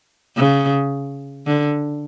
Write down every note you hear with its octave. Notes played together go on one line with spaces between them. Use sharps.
C#3
D3